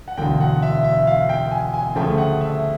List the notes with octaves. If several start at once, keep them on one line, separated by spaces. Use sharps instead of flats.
F#5
E1 D2 D3 G5
F#5
E5
E5
F5
G5
G#5
G#5
D2 C#3 F3 A3 G5
F#5
E5